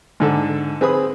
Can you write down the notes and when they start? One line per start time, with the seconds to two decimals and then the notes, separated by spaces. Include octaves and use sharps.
0.20 G#2 D3 A4
0.81 C4 G#4 B4 B5 D#6